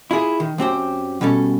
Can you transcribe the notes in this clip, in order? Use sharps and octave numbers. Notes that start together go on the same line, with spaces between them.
E4 F4 G#4
D#3
F#2 C4 G4 C5
B2 G3 C#4 A4